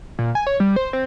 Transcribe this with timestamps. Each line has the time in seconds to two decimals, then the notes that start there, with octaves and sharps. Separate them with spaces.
0.19 A#2
0.35 G#5
0.47 C#5
0.60 G3
0.76 C5
0.93 C4